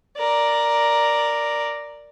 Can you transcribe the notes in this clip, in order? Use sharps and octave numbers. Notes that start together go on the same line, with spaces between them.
A#4 D5